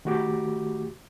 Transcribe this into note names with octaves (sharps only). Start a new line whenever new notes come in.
D#3 A3 F#4 G4 D6